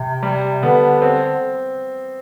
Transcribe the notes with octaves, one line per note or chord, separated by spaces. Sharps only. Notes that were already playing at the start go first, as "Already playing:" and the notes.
Already playing: C3
G3
D3 B3
C4